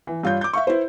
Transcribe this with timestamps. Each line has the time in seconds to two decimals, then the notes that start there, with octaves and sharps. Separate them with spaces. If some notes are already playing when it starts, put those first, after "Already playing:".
0.07 E3
0.23 G2 F4 C#5 G6
0.41 D6 G6
0.53 E5 F5 C#6
0.67 E4 B4 C5